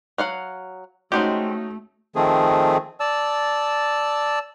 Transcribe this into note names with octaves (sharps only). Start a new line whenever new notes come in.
F#3 F5 F#5
G#3 A3 C4 C#4 D#4 F#4 G4
D#3 F3 A3 C4 G#4
D5 A5 E6